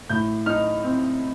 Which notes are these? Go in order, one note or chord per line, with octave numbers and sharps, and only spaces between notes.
A2 G6
D#4 F6
C4